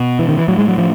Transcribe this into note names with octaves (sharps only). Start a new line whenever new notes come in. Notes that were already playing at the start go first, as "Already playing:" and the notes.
Already playing: B2
E3
D#3
E3
A2 F#3
G#3
F#3
F3